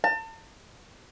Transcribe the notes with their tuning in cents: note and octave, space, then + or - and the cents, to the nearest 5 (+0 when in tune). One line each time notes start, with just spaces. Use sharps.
A5 +35